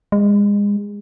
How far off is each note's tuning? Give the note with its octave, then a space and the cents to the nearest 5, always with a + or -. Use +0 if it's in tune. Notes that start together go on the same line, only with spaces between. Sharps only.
G#3 -30